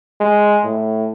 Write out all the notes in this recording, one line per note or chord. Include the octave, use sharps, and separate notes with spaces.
G#3
A2